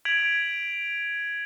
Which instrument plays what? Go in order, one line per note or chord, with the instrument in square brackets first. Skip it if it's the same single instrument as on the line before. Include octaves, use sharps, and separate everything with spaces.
[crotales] G#6 B6 D7 F7 F#7